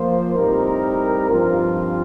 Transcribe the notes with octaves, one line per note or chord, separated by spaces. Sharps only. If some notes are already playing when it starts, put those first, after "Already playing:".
Already playing: F3 A#3 F4 C5
A2 G3 C4 D#4 A#4
G2 F3 C4 F4